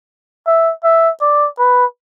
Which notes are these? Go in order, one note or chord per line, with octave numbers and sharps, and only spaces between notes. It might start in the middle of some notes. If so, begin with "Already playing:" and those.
E5
E5
D5
B4